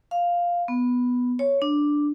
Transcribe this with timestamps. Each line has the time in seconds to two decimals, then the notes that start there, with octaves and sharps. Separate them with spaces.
0.11 F5
0.68 B3
1.39 C#5
1.62 D4